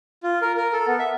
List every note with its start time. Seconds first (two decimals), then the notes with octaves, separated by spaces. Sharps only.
0.23 F4
0.42 A#4
0.57 A#4
0.73 A4
0.87 B3
0.99 E5